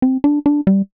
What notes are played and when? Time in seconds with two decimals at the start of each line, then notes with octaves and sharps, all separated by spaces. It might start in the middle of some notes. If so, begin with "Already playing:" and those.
0.02 C4
0.24 D4
0.46 D4
0.67 G3